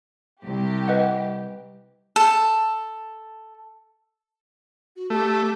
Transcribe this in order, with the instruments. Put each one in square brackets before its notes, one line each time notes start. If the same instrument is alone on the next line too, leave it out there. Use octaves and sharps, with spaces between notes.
[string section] C2 G4
[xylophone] B4 D#5 F#5
[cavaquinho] A4
[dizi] F#4
[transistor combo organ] A3 [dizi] G4